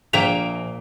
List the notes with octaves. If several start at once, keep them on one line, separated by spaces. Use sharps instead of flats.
A#1 A#2 A#3 G5 B6 F7